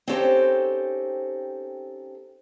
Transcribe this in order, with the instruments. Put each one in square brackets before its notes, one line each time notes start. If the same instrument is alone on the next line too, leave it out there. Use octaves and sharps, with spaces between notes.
[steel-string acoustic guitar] C4 C#4 D#4 G4 A4 C5